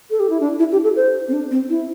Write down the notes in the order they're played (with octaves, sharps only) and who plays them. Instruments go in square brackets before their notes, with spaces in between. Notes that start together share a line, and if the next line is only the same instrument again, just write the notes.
[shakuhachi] A4
G4
E4
D4
E4
G4
A4
C5
C4
D4
C4
E4